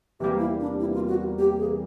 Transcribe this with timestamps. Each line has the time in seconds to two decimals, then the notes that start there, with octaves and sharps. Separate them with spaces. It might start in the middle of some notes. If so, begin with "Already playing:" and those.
0.20 E2 C3 E3 G3 A#3 G4
0.39 E4
0.60 D4
0.80 E4
0.94 F4
1.08 F#4
1.38 G4
1.58 G#4